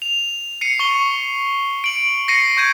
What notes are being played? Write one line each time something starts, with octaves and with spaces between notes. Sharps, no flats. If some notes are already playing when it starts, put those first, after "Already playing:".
F7
C7 C#7 D#7
C#6 G7
D7 F#7
A#6 C7 C#7 D#7
C#6 G6 G#6 D#7